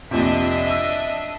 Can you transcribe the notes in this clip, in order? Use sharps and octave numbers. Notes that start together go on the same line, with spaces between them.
A#1 F2 C3 D4 D#5 E5
E6